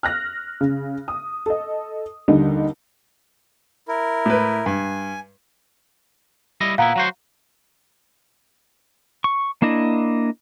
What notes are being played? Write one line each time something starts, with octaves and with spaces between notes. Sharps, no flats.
F6 F#6 A#6
C#3
D#6
A4 D#5
D#2 D3 G3 D#4
E4 A#4
A2 B4
G2 G#5
G3 E4 D#5
A#2 B3 E4 F5 F#5 A#5
F#3 F#4 C5
C#6
A#3 D4 E4 D#5